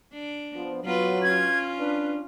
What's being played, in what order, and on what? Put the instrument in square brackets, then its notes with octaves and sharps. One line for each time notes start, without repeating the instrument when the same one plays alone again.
[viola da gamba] D4
[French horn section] F3 B3
[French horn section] F#3 [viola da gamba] B3 F4 B4
[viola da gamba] C#4 F4 [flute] G#6
[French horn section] D4 [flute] B4